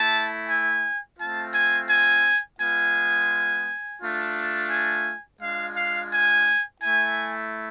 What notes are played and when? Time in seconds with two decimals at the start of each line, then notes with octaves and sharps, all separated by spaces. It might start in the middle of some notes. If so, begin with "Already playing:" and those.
Already playing: A3 E4 A5
0.49 G#5
1.19 A3 C4 F4 A5
1.55 G#5
1.89 G#5
2.60 G#3 B3 F4 G#5
4.01 A3 D4 F4
4.71 G#5
5.41 G#3 D4 F4 F5
5.76 F5
6.12 G#5
6.82 A3 E4 G#5